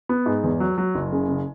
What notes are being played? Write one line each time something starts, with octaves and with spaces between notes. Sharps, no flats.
B3
G#2
E2
F#3
F#3
F#1
C#3
C#3